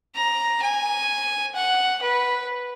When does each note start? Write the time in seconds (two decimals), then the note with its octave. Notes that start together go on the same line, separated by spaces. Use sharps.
0.15 A#5
0.62 G#5
1.55 F#5
2.03 B4